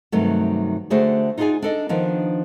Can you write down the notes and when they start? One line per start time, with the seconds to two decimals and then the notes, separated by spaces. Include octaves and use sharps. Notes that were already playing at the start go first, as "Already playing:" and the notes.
0.12 G2 C3 D#3 F#3 A3
0.90 D3 A3 F#4 G#4 C5 D5
1.38 D#4 F4 F#4 G#4 D5 G#5
1.62 D4 A4 D#5
1.89 D#3 F3 B3 D4 D#4